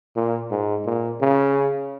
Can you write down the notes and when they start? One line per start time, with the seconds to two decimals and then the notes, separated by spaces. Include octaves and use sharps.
0.16 A#2
0.51 G#2
0.86 A#2
1.21 C#3